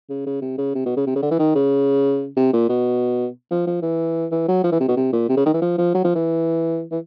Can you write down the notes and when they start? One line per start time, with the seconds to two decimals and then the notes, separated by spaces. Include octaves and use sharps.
0.09 C#3
0.26 C#3
0.42 C3
0.58 C#3
0.75 C3
0.86 B2
0.97 C#3
1.07 C3
1.16 C#3
1.23 D3
1.31 E3
1.39 D#3
1.56 C#3
2.37 C3
2.53 A#2
2.69 B2
3.51 F3
3.67 F3
3.82 E3
4.31 E3
4.48 F#3
4.64 F3
4.72 E3
4.80 C3
4.88 B2
4.97 C3
5.13 A#2
5.29 C3
5.37 C#3
5.46 D#3
5.54 E3
5.62 F3
5.78 F3
5.95 F#3
6.05 F3
6.15 E3
6.91 E3